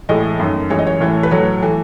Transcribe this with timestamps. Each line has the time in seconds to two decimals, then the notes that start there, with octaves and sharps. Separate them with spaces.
0.09 A2 E3 G#3 D#5
0.40 F#2 D#3 A3
0.70 F#2 E3 G#3 C#5
0.79 D#5
0.87 C#5
1.00 A2 E3 A3
1.23 B4
1.31 A2 F#3 A3 C#5
1.62 E3 A3